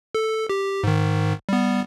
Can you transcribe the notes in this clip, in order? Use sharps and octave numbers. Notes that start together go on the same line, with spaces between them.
A4
G4
G#2 D#3
G3 B3